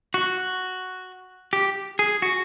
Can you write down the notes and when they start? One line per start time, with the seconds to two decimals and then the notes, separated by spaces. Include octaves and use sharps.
0.14 F#4
1.53 G4
1.99 G#4
2.22 F#4